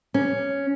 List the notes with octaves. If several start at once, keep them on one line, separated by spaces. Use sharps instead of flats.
C#4